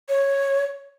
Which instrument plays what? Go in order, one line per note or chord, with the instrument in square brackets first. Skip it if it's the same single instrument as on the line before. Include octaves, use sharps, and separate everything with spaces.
[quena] C#5